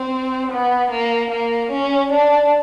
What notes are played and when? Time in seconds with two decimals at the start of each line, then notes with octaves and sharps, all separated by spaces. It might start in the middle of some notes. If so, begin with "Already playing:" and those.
Already playing: C4
0.51 B3
0.91 A#3
1.31 A#3
1.71 C#4
2.12 D4